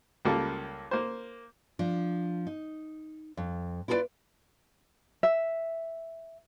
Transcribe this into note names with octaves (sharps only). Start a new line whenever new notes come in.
C#2 G3 A#3 F4 A4
A#3 C5
F3 D4
D#4
F2
E4 F4 G#4 A#4 B4 D5
E5